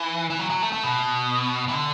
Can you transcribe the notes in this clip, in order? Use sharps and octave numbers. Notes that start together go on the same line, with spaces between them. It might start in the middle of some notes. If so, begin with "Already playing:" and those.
Already playing: E3
E3
F#3
F#3
A3
A3
B2
E3
D3